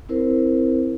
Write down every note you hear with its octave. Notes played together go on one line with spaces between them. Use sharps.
C4 E4 A#4 C5